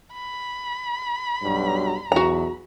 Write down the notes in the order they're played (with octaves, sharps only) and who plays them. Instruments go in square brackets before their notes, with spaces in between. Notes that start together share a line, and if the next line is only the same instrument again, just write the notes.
[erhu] B5
[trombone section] B1 G2 F#3
[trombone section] B1 E2 [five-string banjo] F#4 A#5